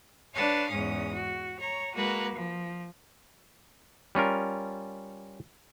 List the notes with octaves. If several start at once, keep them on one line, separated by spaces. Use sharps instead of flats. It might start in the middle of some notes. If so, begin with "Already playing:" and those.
D4 B4 C#5 F5 A5
E2 G#2 C#4 D#6
F#4
C#5 A#5
G#3 A#3 F#4 B4
F3
G3 C#4 F4 A#4